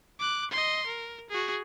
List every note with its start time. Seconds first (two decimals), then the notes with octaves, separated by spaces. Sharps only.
0.20 D6 F#6
0.51 D#5 C6
0.87 A#4
1.30 F#4 G#4